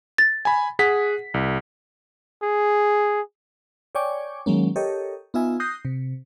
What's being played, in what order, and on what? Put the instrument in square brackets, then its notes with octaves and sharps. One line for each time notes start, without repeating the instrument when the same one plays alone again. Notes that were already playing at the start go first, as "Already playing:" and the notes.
[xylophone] A6
[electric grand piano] G#5 B5
G#4 F#5 B6
C2
[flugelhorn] G#4
[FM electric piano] C#5 D5 G5 G#5 C#6 D6
D#3 F#3 G#3 A#3 C#4
G4 A4 A#4 C#5 D#5
B3 D#4 F4 E5 G#5
D#6 F#6 G6 A#6 C7
C3